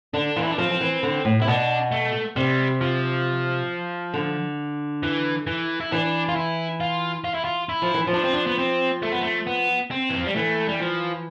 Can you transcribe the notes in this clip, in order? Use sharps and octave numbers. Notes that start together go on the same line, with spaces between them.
D3 D4
E3 F4
E4
D4
F3 C4
F3
E3
D3
A2
C3 E4
B2 D4
A3
C3 G3
F3
D3
E3
E3
E4
E3 D4
F4
E4
F4
F4
E4
F4
E4
F3
E3
F3
D4
C4
D4
B3
C4
A3
B3
A3
B3
C4
E3
F3
G3
E3 A3
G3
F3